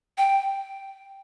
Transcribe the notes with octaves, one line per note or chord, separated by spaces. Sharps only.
G5